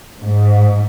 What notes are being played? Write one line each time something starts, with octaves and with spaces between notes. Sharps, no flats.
G#2